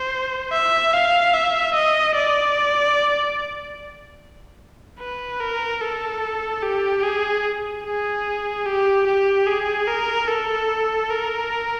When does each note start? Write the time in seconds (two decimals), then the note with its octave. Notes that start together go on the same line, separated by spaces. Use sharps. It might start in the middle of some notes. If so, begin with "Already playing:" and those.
Already playing: C5
0.52 E5
0.93 F5
1.34 E5
1.74 D#5
2.15 D5
5.00 B4
5.40 A#4
5.81 A4
6.63 G4
7.03 G#4
7.84 G#4
8.66 G4
9.07 G4
9.47 G#4
9.88 A#4
10.28 A4
11.10 A#4